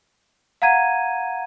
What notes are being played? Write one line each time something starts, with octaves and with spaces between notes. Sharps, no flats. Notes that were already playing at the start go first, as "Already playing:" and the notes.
F5 F#5 A#5 G#6 D#7